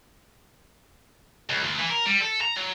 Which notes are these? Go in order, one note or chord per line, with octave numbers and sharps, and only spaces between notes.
C#2
D2
E3
A#4
G3
A4
A#5
F#3